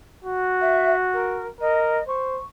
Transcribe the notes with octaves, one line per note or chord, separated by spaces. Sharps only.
F#4
E5
A#4
A#4 D#5
C5 C#6